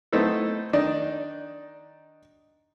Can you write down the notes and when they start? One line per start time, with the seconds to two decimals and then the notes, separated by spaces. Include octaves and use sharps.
0.12 A3 B3 C4 D#4 E4 A4
0.73 D#3 D4 D#4